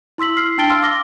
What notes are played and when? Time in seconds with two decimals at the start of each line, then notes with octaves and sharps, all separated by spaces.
0.18 E4 C6 E6 B6 F#7
0.37 F6 C7
0.58 D4 G5 A5 A6 D7 G7
0.70 F5 C6 E6 F6
0.82 F5 D6 F6 A#6 G7